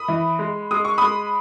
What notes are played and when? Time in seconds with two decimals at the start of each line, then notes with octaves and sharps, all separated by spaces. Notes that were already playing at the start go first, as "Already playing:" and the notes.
Already playing: B5 D#6
0.08 E3
0.39 G#3
0.71 G#3 D#6
0.85 C#6
0.98 G#3 B5 D#6